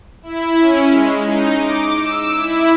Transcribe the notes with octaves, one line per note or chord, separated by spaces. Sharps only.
E4
C#4
G#3
D#4
D6
E6
E4